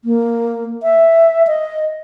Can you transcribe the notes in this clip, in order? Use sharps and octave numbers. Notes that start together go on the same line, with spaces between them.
A#3
E5
D#5